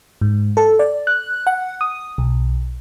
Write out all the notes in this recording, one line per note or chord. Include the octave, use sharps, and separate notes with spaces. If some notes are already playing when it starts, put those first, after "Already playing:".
G#2
A4
D5
F#6
F#5
D#6
B1